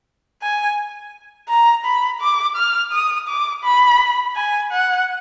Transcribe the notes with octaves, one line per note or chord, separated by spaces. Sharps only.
G#5
A#5
B5
D6
F6
D#6
D6
B5
G#5
F#5